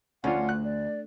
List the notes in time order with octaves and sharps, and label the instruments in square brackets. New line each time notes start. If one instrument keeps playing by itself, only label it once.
[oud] D2 [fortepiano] C#4 D4 F4 [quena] F#5
[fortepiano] F#6
[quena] D5